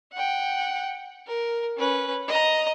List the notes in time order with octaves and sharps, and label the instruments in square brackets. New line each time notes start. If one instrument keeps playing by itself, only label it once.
[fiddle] F#5 G5
A#4
C#4 B4
D#5 A#5